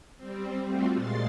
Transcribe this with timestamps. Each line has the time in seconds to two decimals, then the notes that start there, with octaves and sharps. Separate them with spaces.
0.17 G3 C4
0.65 G3 A3 C4 F4 F#4
0.95 A#2 G#3 C6 A6